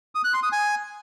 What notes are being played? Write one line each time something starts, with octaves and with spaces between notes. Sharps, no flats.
D#6
F#6
C6
D#6
G#5